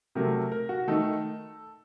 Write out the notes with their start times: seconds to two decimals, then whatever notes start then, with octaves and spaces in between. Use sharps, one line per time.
0.15 C3 F#3 A3 A#4
0.52 A#4
0.69 F#4
0.88 D#3 A3 D#4 A4